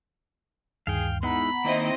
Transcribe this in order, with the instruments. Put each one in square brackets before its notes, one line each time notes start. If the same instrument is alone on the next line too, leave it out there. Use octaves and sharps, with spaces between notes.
[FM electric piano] D2 G2 D#3 [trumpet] G#4 [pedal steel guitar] F5 G5
[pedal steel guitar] G#3 D#4 E4 [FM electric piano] B3 F#5 A#5 [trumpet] B5
[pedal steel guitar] D#3 A#3 [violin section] C4 E4 D#5